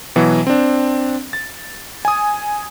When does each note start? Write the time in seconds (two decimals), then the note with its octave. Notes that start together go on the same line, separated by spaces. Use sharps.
0.16 B2 E3 F#3
0.47 C4 D4
1.33 A6
2.05 G#5 D#6